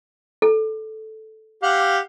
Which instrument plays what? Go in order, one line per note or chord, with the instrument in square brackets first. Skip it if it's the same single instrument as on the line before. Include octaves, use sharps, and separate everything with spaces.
[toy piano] A4
[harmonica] G4 F5 F#5